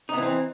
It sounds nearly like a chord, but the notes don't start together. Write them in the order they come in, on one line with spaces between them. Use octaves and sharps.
D#4 B3 E3 C4